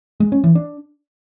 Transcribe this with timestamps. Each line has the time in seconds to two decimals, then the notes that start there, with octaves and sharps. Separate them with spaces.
0.20 G#3
0.32 C#4
0.44 E3
0.55 D4